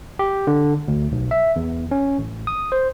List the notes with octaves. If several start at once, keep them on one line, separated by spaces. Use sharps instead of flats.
G4
D3
D2
B1
E5
E2
C#4
A1
D#6
C5